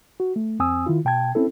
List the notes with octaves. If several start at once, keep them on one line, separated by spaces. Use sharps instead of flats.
F#4
A3
F2 C4 G#5 D#6 E6
D#3 E4 F4
B2 G5 A5 G#6
C4 C#4 E4 A4